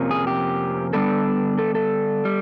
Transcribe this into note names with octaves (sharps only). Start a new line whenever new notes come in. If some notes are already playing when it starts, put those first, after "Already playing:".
Already playing: F2 C3 F3 A#3 C#4
G#4
G4
D3 G3 B3 D4 A4
A4
A4
G3